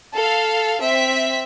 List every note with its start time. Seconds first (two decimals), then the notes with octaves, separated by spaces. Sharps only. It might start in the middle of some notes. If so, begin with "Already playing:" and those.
0.14 A4 F5
0.81 C4 E5 B6